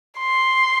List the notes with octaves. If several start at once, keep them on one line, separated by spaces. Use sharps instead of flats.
C6